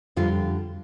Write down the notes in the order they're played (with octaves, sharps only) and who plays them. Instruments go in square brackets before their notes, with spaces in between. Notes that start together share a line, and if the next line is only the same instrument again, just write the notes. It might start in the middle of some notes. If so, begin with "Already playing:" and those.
[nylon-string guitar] F2 D3 G3 F4